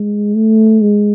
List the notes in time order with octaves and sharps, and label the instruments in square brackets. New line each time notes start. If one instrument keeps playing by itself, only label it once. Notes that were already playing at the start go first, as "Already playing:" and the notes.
Already playing: [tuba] G#3
A3
G#3